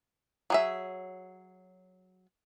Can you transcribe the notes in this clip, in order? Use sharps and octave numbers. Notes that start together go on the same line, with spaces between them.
F#3 G#4 E5